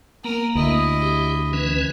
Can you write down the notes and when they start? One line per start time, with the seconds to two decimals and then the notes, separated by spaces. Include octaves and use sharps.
0.24 A#3 B3 A#4
0.55 D2 E4 D#5
1.02 G4
1.53 E3 C#4 B4